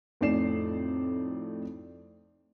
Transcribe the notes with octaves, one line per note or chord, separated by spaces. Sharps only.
F2 A2 D#4 D5 C7 E7